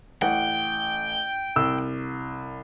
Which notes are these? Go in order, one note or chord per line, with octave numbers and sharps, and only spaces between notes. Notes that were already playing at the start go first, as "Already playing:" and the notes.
A1 F#5 G5
C2 E6